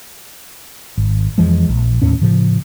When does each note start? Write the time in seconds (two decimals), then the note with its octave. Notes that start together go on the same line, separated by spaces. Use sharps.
0.98 G#1
1.38 F2 E3 F3 G#3
1.69 A#1
2.02 D#2 A2 C#4
2.21 A2 C#3 F3